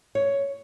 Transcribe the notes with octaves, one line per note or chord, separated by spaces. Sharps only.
C#5